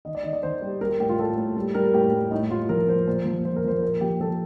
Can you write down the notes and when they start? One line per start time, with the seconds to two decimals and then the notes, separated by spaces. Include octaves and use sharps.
0.05 D#3 D#5
0.15 D5
0.24 D#3 D#5
0.33 D5
0.43 D#3 C5
0.62 G3
0.81 G3 A#4
0.90 G4
1.00 A2 G4
1.09 F4
1.18 A2 A4
1.37 A2
1.57 G3
1.74 G3 A#4
1.93 A2 G4
2.12 G3
2.31 A2 D#4
2.51 A2 F4
2.69 F3 A#4
2.88 F3 C5
3.07 A#2 C5
3.25 F3
3.45 F3 C5
3.56 A#4
3.64 F3 C5
3.78 C5
3.83 A#2 A#4
4.01 F3 G4
4.20 F3 A4